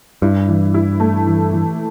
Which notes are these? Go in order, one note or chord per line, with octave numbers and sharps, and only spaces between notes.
G2 E4
E3
E4
A3
E3
E3